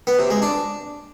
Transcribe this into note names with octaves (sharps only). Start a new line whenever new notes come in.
B3
C3
G#3
D4